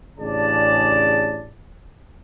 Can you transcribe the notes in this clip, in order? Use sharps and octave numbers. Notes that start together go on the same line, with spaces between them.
A1 C#3 D4 G#4 D5 A5